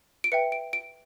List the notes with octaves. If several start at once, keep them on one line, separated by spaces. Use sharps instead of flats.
D7
B4 E5 G5 C#7
D7
D7